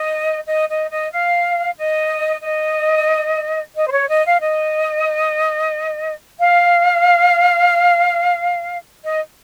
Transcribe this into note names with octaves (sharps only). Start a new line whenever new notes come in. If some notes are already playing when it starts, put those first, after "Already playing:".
Already playing: D#5
D#5
D#5
D#5
F5
D#5
D#5
D#5
C5
C#5
D#5
F5
D#5
F5
D#5